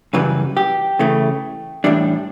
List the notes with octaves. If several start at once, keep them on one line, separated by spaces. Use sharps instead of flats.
F#2 C#3 E3 G3 B4
G4
C#3 E3 A3
A2 E3 G3 D4